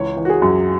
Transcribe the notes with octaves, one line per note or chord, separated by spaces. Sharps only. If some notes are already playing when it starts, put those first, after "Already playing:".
Already playing: C#2 E3 C#5
E3
F#4
G#4
F#2